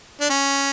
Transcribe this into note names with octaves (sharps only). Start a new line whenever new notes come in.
D4
C#4